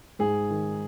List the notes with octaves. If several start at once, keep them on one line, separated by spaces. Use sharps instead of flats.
G#2 G#4
D#3